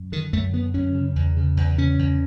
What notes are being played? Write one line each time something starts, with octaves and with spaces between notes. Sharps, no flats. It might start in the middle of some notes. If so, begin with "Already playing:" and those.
Already playing: F#2
D3 D#3
F#2 A3
D3 B3
F#2 C#4
C#3
E2
C#3
E2
C#3 C#4
E2